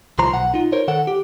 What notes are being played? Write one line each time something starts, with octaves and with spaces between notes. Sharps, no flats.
C2 F3 C5 A#5
B1 F#5
D#4 F4
A#4 C5 C#5
D#3 A4 F#5
G4